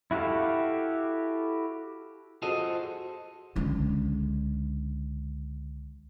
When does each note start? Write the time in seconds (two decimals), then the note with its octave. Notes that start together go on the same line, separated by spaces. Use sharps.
0.11 E4 F#4 G4 A4 F5
2.42 F4 F#4 G#4 A4 C5 D#5
3.56 C#2 D3